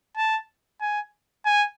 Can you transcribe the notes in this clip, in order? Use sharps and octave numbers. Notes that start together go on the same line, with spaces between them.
A5
G#5
G#5